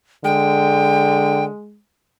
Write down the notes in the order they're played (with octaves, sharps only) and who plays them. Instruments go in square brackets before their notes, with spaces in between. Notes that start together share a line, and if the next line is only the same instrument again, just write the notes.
[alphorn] D3 [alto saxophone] G#3 [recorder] G5